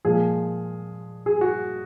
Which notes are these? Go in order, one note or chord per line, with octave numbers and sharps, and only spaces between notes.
A#2 F3 G#3 G#4
G#4
F#4